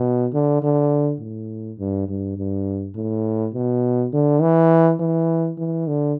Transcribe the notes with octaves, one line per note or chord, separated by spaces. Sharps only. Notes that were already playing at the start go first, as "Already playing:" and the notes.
Already playing: B2
D3
D3
A2
G2
G2
G2
A2
B2
D3
E3
E3
E3
D3